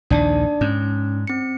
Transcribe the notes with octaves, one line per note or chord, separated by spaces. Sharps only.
A#1 D#2 D#3 D4 D5 A5
G#2 C#4
C4 C#7